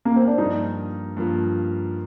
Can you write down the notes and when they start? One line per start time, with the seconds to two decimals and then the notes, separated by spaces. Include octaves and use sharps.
0.05 A#3
0.16 C4
0.27 D4
0.38 G2 F3 A#3 D#4 F4
1.17 G2 F3 A#3 F4